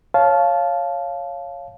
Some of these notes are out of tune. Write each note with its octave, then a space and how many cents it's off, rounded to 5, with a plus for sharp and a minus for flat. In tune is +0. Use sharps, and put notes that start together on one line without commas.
C#5 +0 F5 +0 A5 -20